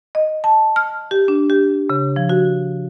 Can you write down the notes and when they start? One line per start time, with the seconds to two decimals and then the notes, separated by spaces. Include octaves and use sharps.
0.15 D#5
0.44 A5
0.76 F6
1.11 G4
1.28 D4
1.50 G4
1.90 C#3
2.16 F3
2.29 F#4